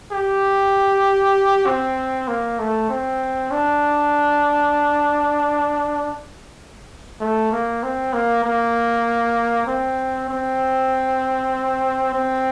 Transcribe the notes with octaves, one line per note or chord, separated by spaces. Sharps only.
G4
C4
A#3
A3
C4
D4
A3
A#3
C4
A#3
A#3
C4
C4
C4